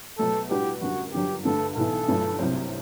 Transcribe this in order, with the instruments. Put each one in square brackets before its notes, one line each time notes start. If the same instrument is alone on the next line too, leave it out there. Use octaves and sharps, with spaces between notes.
[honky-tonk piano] B2 F#3 A3 [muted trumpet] A4
[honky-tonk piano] A2 G3 D4 F#4 B4 [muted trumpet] G4
[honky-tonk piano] F#2 D3 G3 [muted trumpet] F#4
[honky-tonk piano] G1 G2 D3 F#3 [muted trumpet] G4
[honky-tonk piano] G2 D3 A3 [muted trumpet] A4
[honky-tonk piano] B1 A2 E3 B3 E4 [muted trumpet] A4
[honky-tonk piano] G1 G2 F#3 A3
C2 C3 F#3 C4